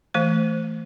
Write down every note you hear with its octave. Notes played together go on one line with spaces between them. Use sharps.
E3 A3 C5